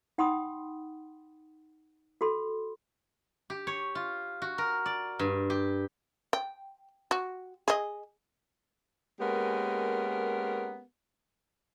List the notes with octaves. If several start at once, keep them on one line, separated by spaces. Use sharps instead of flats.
D#4 F#5 G5 B5 C6 D#6
F#4 A4 B5 C6
G4
C#5
F4
F#4
A#4
D5
G2
G4
G5
F#4
G#4 D#5
G#3 A#3 B3 C#4 G4 A#4